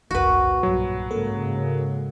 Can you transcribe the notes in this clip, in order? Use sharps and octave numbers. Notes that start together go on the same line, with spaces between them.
G1 C2 F2 A#2 F#4 B4
B1 G2 F#3
G#2 C#3 G#3 A#3 A4 A#4